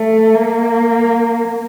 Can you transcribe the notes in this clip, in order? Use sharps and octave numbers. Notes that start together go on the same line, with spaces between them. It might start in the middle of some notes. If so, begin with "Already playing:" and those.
Already playing: A3
A#3